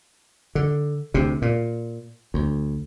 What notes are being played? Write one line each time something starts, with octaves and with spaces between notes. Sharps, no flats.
D3
D2 C3
A#2
D2